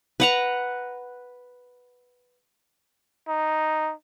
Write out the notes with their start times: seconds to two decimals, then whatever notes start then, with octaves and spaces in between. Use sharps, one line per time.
0.20 B4 F#5 A#5
3.28 D#4